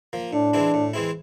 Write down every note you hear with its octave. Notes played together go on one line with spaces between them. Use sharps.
F3 A#3
A2 D4
E3 G#3 C4 E4
A2
E3 G#3 C4 E4